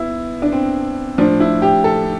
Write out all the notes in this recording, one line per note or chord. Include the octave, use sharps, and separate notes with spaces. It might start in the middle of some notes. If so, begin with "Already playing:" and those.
Already playing: B3 E4
D4
C4
A2 F3 D4
E4
G4
A4